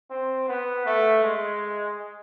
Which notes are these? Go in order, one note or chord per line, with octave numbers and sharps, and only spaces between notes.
C4
B3
A3
G#3